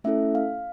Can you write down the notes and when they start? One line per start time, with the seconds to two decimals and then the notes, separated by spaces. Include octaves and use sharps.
0.04 A3 C#4 E4 A4 E5
0.35 F5